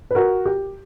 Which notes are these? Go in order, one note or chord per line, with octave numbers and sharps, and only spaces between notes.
B4
F#4 A#4
G4